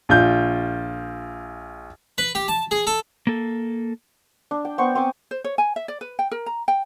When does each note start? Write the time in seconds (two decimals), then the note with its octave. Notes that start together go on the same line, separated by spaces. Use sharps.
0.09 A#1 F4 G6
2.18 B4
2.35 G4
2.48 A5
2.71 G#4
2.87 A4
3.27 A#3 A4
4.51 D4
4.65 G5
4.78 B3 C5 C#6
4.95 C4 G#5 D6 D#6
5.31 C5
5.44 C#5
5.58 G#5
5.76 E5
5.88 D5
6.01 B4
6.19 G5
6.31 A#4
6.46 A#5
6.68 G5